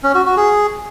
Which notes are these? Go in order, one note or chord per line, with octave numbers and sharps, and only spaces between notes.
C#4
F#4
F#4
G#4